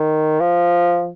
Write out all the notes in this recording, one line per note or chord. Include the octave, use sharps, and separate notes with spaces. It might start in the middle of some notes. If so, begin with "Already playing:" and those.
Already playing: D#3
F3